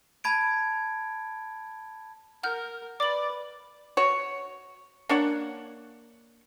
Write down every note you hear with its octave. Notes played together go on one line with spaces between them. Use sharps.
A5 B5 G#6 D7
A#4 F#5 F6 G6
B4 D5 D6 F#7
F#4 C#5
A#3 D4 C#5 F#5